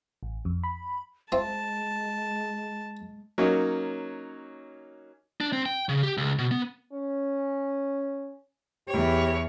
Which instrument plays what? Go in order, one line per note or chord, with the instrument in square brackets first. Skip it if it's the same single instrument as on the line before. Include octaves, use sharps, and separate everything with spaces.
[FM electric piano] A1
F2
B5
[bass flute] G#3 [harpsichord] C4 F4 E5 [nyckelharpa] A5
[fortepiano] F#3 A#3 C#4 D#4
[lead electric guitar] D4
C4
G5
C#3
G4
C#2
B2
B3
[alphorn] C#4
[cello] E2 C#5 [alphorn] G4